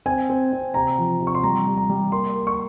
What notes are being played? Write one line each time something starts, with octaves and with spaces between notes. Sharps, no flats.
C4 G#5
C4
C4
C3 A#5
F3
C3
C#6
C6
G3 A#5
G3
A#5
G3
A#3 C6
A#3
C#6